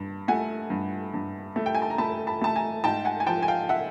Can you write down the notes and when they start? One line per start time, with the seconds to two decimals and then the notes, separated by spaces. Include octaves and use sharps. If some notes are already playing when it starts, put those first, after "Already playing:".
Already playing: G2
0.28 A3 F#5 G#5
0.70 G2
1.14 G2
1.56 A3
1.66 G5
1.75 G#5
1.82 A5
1.90 A#5
1.98 A3 A5 B5
2.27 A5 B5
2.42 A3 A5
2.56 G#5 A#5
2.84 G#2 G5 A5
3.05 F#5 G#5
3.20 G#5
3.27 F3 G5 A5
3.43 G#5
3.48 F5 G5
3.69 E5 F#5